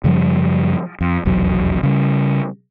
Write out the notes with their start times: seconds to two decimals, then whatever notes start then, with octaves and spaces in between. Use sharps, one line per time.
0.04 F#2 C#3 F3 G3
1.01 F2
1.25 F1 B1 E2 F#3
1.83 C#3 G3